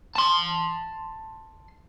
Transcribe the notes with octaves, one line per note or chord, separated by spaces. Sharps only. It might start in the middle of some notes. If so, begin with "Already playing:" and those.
A5 C6